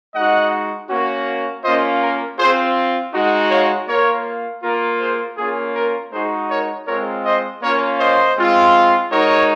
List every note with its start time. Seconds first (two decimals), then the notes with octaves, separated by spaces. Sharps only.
0.14 G#3 D#4 F#4 D#5 F#5
0.89 A#3 C#4 F#4
1.64 A#3 C#4 F4 C5 D#5
2.02 A#4
2.39 C4 F4 G#4 C5
3.14 G#3 D#4 F#4
3.51 C#5 F5
3.88 A#3 F4 A#4 C#5
4.63 A#3 F4 A#4
5.00 G#4 C5
5.38 A#3 C#4 F4 G#4
5.75 A#4
6.12 G#3 D#4 F#4 G#4 C5
6.49 A#4 C#5
6.87 G#3 C4 F4 A#4 C#5
7.25 C5 D#5
7.62 A#3 C#4 F4 A#4 C#5
7.99 C5 D#5
8.37 G#3 C4 F4
9.11 G#3 D#4 F#4 A#4 C#5